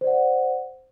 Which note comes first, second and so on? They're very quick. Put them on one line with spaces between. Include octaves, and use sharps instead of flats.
C5 D5 F#5